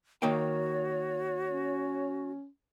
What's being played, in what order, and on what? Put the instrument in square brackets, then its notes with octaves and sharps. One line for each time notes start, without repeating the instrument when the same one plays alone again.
[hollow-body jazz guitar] D#3 A#3 G5 [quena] F#4 [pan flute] C#5
[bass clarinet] C#4